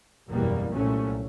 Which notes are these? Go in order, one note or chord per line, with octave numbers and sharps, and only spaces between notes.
F#1 E2 B2 G3 A#3
C2 A#2 F#3 A3 C#4